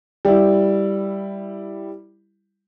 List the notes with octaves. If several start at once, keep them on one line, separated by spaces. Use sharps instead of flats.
G3 E4